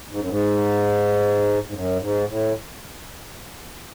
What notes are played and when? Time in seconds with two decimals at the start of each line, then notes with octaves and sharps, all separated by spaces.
0.11 G#2
0.20 F#2
0.28 G#2
1.68 G#2
1.73 F#2
2.00 G#2
2.28 A2